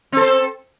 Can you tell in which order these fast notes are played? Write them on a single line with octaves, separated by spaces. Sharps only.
C4 A4 C5